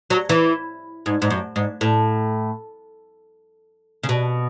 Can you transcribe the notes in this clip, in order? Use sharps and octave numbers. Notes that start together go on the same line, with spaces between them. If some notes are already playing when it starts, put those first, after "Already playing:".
F#3
E3
G#2
G#2
F#2
G#2
A2
C#3
B2